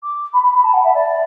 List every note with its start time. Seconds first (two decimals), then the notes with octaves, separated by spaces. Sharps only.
0.03 D6
0.33 B5
0.43 B5
0.54 B5
0.64 A5
0.74 F#5
0.84 E5
0.94 D5